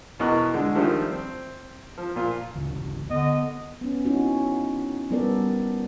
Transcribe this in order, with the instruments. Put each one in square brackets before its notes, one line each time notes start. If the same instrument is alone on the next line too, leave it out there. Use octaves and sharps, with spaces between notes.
[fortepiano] E2 B2 A#4 D#5 C#6 F#6
D3 G#3 D4
D#3 F3 G3 A3 D4
C4
F3
A#2 F4
[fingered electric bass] D2 C#3 E3
[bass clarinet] D3 [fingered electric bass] B3 [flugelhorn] D#5
[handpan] B3 C#4
C4 C#4 D#4 E4 F#4
G3 B3 A4 A#4 D5